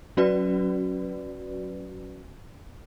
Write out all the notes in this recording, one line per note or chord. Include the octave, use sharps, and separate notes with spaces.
F#3 C#4 F#4 B4 D5